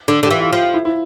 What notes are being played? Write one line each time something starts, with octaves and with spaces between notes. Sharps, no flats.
D3
D3
G4
E3 F4
F4
F3
F4
E4
E4